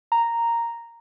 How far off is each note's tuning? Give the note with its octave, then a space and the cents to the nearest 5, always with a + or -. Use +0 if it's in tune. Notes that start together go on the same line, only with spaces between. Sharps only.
A#5 -5